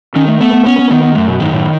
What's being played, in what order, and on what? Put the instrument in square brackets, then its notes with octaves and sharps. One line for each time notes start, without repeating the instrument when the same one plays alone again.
[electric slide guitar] D#3 [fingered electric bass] C#4
[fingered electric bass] A3
[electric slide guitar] A3 [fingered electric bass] B3
[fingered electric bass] B3
[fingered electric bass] B3 [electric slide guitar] C#4
[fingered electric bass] B3
[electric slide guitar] D#3 [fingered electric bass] B3
[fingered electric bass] B3
[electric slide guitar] F#2 [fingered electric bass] A3
[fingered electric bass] B2
[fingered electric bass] G#2 [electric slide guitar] D#3
[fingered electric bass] A2